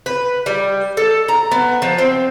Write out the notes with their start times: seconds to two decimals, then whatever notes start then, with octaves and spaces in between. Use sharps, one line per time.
0.06 B4
0.46 G3
0.97 A4
1.28 A#5
1.52 B3
1.82 F3
1.98 C4